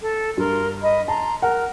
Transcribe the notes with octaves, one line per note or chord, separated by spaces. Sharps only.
A4
G2 A#4 C6
D#5 B5
A5 A#5 C6
A#4 F#5